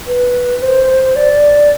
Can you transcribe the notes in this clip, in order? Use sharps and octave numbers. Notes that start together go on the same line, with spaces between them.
B4
C5
D5